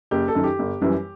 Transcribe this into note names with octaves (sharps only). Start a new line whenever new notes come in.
F#1 G4
A4
F#2 D#3
G4
G1
F#2 E3 G3